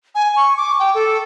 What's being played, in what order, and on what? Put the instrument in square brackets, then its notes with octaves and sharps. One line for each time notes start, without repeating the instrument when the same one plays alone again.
[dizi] G#5
C#6
D6
G5
A4